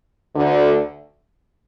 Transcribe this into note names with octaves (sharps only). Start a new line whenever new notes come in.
D2 D3